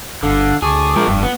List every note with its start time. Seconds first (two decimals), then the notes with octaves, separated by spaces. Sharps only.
0.23 G1 D3 F5
0.62 D2 G#4 A5 C#6 D6
0.96 F3 G#3 A#4
1.08 F1 G2
1.23 B3